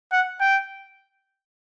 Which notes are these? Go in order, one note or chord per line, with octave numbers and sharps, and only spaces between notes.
F#5
G5